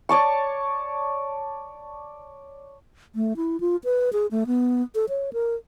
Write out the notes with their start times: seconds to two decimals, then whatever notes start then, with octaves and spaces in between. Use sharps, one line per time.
0.09 C#5 D5 A5 C#6
3.15 A3
3.37 E4
3.60 F4
3.84 B4
4.13 G#4
4.31 A3
4.47 B3
4.95 A4
5.09 C#5
5.33 A#4